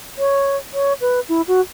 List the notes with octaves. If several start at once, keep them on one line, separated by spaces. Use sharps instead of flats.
C#5
C#5
B4
E4
F#4